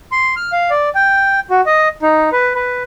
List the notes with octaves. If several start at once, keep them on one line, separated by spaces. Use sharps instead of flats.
C6
F6
F5
D5
G5
F#4
D#5
D#4
B4
B4